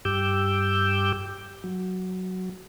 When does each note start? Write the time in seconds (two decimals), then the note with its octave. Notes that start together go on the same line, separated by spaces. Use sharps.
0.05 G2 G4 D6 E6 G6
1.64 F#3